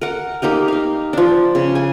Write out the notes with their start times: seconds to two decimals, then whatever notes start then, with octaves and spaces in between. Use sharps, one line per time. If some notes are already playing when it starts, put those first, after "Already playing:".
0.01 A#4 F#5
0.42 A#3 D#4 G4 A#4
0.68 D#4 F5
1.13 F3 D4
1.55 C#3
1.75 G#5